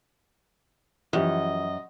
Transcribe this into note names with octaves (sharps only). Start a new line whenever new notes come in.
F#2 E3 F3 G4 D#5